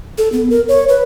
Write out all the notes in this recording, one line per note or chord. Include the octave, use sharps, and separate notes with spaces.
A4
B3
A#4
C#5
B4